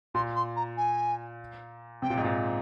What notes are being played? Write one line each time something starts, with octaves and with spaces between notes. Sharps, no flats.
A#2 C6
C6
A#5
G#5
C3 G5
A#2
G#2
A#2